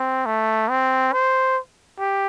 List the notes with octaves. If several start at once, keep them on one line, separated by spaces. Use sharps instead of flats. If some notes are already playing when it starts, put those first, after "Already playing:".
Already playing: C4
A3
C4
C5
G4